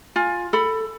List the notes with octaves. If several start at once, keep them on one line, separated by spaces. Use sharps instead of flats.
F4 G#5
A4 B5